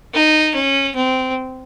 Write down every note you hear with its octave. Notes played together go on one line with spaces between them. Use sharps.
D#4
C#4
C4